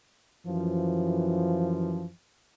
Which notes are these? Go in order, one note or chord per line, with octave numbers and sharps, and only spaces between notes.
F#2 E3 F3